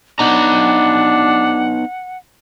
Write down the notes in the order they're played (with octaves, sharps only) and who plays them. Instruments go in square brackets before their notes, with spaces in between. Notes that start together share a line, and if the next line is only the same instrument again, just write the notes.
[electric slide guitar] B3 D#4 A#5 [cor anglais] D4 [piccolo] F#5